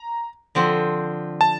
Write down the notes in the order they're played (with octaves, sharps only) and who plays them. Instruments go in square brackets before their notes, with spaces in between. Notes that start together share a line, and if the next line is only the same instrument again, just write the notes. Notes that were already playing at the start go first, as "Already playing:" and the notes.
Already playing: [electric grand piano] A#5
[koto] D3 F3 C4
[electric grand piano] A5